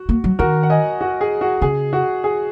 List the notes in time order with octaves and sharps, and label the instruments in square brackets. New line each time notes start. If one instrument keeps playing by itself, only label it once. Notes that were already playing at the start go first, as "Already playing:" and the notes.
Already playing: [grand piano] F#4
[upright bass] A#3
F#3
[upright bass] D#3 [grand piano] F#4 A#4
[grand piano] F#5
D#5 G#5
F#4
G#4
F#4
[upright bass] C#3 [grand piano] G#4
[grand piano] F#4
G#4